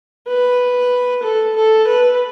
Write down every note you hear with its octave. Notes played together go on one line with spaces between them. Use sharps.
B4
A4
A4
B4